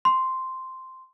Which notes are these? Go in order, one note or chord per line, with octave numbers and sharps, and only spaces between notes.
C6